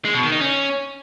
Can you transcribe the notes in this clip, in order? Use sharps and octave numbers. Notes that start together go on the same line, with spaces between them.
G#3
B2
D#3
D#4
C#4